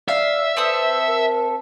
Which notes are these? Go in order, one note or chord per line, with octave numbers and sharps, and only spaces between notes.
D5 E5 F5
C4 A4 B4 D#6
A#4